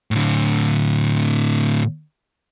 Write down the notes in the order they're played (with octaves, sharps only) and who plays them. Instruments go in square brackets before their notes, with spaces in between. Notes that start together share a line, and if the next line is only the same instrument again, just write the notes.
[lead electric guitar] A2 D3